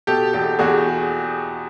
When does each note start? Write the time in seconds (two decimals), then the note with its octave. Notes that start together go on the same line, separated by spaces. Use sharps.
0.07 B2 G4 A4
0.33 E2 G4 A4
0.59 E2 F#4 G#4